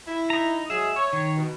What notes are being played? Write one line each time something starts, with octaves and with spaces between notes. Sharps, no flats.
E4
D#4 A#5
F#3 G#3 G#4 E5
C#5
D#3
B2